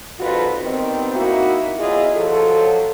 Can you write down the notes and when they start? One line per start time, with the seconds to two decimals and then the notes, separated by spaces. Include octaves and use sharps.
0.19 F2 D#3 G3 F4 F#4 B4
0.61 D#3 G3 B3 C4
1.13 A#3 D#4 E4 F#4
1.79 E2 F#3 E4 F4 G#4 D#5
2.15 F3 F#3 F#4 A4